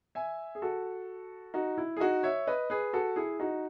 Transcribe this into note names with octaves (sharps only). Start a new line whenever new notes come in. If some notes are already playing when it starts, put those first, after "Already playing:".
E5 G#5
G#4
F#4 A4
D#4 F#4
E4
G#4
D#4 F#4
C#5 E5
B4 D#5
G#4 B4
F#4 A4
E4 G#4
D#4 F#4